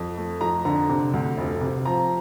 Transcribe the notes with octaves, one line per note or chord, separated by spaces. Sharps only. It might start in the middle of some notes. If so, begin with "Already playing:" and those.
Already playing: F2
A3
F2 A#5
D3 A#5
C3
D2
F1
C3
F3 A#5